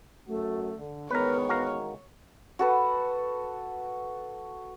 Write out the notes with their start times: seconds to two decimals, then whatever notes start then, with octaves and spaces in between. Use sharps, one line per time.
0.28 F#2 A3 F#4
0.76 D3
1.11 A1 D#3 G#3 B3 A#4 B4 C#5
1.49 F#4 A#4 F5
2.59 F#4 A4 B4